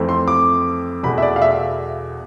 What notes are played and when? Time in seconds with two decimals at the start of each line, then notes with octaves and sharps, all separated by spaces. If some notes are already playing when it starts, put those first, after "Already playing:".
Already playing: F2 E3 A3 C4
0.09 C6
0.28 D6
1.03 E2 B2 A3 B5
1.18 E5
1.22 D5
1.36 F5
1.42 E5